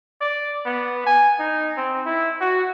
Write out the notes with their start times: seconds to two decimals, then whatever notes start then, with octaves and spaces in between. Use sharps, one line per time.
0.21 D5
0.65 B3
1.06 G#5
1.39 D#4
1.77 C4
2.06 E4
2.41 F#4